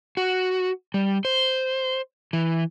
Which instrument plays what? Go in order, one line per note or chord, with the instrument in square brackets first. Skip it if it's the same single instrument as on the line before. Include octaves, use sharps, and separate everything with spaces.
[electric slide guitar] F#4
G3
C5
E3